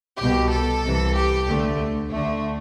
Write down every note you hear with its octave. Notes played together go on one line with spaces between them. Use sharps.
C2 B2 G4
A4
C2 C3 E3
G4
D2 D3 A3
D2 D3 A3